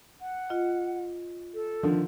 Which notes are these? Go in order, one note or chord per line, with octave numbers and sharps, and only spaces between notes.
F#5
F4 D#5
A4
D3 D#3 F3